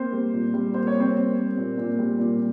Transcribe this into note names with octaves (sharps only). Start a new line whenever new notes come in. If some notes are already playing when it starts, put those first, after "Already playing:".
Already playing: A#3 C4 C5
G3
A#2
G3
A#3 C5
C#5
G3 C4 C5
A#3
A#3
A#2
A#2
G3
A#2